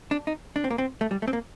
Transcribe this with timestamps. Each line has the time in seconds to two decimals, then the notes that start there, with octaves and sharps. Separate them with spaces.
0.11 D4
0.27 D#4
0.56 D4
0.64 C4
0.70 A#3
0.78 C4
1.01 A3
1.11 G3
1.22 A3
1.28 C4
1.33 A#3